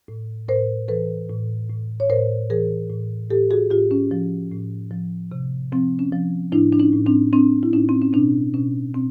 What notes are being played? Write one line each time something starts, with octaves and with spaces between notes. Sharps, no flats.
A2
A2 A#4 C5
E3 A4 B4
A2
A2
C#5
A2 A#4 C5
E3 G#4 A#4
A2
A2 G4 A4
F#4 G#4
A2 F4 G4
C#4
F3
A2
F3
C3
F3 C4
C#4
F3
A2 D4 E4
D4
C#4 D#4
A2
C4 D4
A2 C4 D4
E4
A2 C#4 D#4
C4
C#4
B2 C4 D4
B2 C#4
B2 C4